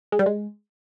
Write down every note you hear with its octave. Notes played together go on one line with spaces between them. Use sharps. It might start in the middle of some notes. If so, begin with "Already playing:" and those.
G#3
G3
G#3